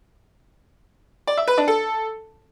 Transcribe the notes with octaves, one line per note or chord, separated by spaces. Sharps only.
D5
E5
B4
D4
A4